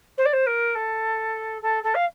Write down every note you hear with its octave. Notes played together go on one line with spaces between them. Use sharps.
C5
D5
C5
A#4
A4
A4
A4
F5